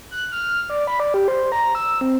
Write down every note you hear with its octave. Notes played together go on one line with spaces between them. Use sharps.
F#6
F6
D5
B5
D5
G4
C5
A#5
E6
C4